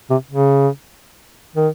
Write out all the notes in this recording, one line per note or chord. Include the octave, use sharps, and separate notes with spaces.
C3
C#3
D#3